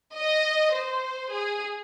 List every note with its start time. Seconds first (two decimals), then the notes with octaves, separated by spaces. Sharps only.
0.16 D#5
0.75 C5
1.32 G#4